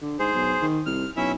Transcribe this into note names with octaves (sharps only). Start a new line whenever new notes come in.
D3
G#2 G#4 C5
B1
D#3
C2 F6
B1 C#4 E4 E5